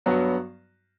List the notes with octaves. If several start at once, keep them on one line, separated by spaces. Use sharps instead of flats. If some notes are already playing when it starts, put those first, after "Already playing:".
G2 F#3 B3 F#4